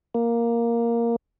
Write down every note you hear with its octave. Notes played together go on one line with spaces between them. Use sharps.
A#3